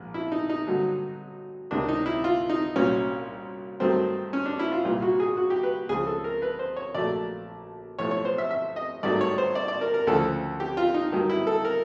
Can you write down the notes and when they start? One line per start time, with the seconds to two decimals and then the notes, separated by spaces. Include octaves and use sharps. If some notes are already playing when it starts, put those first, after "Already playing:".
Already playing: A#1 G#2
0.14 E4
0.32 D#4
0.49 D#4
0.67 G2 D3 F#3
1.71 C#2 C3 D#3 D4
1.89 D#4
2.06 E4
2.24 F4
2.50 D#4
2.76 C2 A#2 F#3 C#4
3.80 G2 D#3 F#3 A3 C4
4.33 C#4
4.46 D4
4.59 E4
4.72 F4
4.85 C2 A#2 G3 F4
5.02 F#4
5.20 G#4
5.37 F#4
5.50 G4
5.63 B4
5.89 C#2 C#3 F3 G#4
6.07 A4
6.24 A#4
6.42 B4
6.59 C5
6.77 C#5
6.94 A#1 A#2 F#3 A3 D5
7.99 B1 A2 F3 A3 C#5
8.11 C#5
8.25 C5
8.38 E5
8.51 E5
8.76 D#5
9.03 G#1 G2 D#3 F#3 A3 D5
9.21 C#5
9.38 C5
9.55 D5
9.68 D5
9.81 A#4
9.94 A#4
10.07 D2 C#3 F3 A4
10.60 G4
10.77 F4
10.94 D#4
11.12 G2 D#3 F#3
11.30 E4
11.47 A4
11.65 A#4